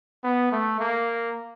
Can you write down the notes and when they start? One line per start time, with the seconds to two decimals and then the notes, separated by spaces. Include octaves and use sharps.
0.24 B3
0.52 A3
0.80 A#3